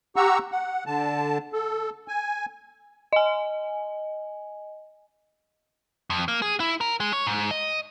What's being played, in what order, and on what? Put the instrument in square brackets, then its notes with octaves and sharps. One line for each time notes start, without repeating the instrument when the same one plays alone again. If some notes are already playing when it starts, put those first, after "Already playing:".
[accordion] G4 F#5 A#5 C#6 E6
F#5
D3 A5
A4
G#5
[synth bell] D#5 G#5
[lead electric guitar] F2
A#3
G#4
E4
A#4
G#3
C#5
G#2
D#5